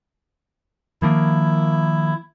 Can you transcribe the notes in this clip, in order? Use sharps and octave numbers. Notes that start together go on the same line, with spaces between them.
D#3 F3 A#3 E4